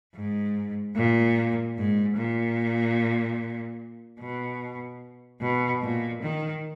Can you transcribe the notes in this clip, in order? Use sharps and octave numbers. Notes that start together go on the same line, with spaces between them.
G#2
A#2
G#2
A#2
B2
B2
A#2
D#3